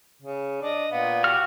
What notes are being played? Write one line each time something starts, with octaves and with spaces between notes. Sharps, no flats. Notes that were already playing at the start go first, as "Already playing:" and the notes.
C#3
D4 D#5
A#2 B3 F5
F#4 G4 F6